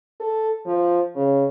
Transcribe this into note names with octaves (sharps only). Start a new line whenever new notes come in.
A4
F3
C#3